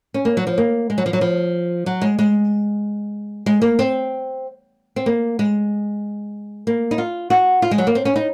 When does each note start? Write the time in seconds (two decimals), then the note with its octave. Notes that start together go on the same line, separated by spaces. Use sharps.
0.14 C#4
0.25 A#3
0.37 F#3
0.47 F3
0.58 A#3
0.90 G#3
0.98 F#3
1.06 F3
1.13 F#3
1.21 F3
1.86 F#3
2.02 G#3
2.19 G#3
3.46 G#3
3.62 A#3
3.79 C4
4.96 C4
5.06 A#3
5.39 G#3
6.67 A#3
6.91 D#4
6.98 F4
7.30 F#4
7.62 F4
7.71 G#3
7.78 F#3
7.87 A#3
7.95 C4
8.05 C#4
8.16 D#4